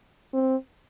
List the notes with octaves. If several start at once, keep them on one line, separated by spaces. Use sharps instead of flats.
C4